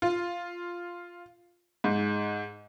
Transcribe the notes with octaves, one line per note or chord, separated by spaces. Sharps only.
F4
G#2